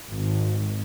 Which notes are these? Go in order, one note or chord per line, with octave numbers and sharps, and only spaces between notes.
G#1